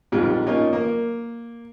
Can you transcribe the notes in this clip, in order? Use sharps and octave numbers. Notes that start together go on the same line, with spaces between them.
A#1 F2 G#2 G3 F4
A#3 C#4 D#4 F4
A#3